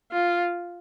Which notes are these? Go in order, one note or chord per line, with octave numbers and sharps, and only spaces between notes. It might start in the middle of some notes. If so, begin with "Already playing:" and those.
F4